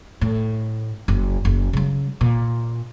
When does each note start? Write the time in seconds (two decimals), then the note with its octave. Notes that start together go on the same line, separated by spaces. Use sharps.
0.21 A2
1.08 F#1
1.45 F#1
1.73 C#3 F#3
2.21 A#2